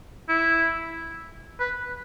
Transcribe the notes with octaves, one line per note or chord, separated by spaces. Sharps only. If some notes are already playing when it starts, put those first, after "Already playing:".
E4
B4